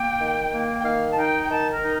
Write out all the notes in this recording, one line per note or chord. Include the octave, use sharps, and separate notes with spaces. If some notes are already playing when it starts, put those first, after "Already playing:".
Already playing: A#3 G5
D#3
A#3
G5
D#3 F5
A5
D#4 G5
G5
D#3 A5
A#4
D#4